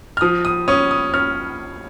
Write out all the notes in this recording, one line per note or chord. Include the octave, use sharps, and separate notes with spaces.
F6
F3 D#6
D#6
C#4 D#6
D#6
C#4 F6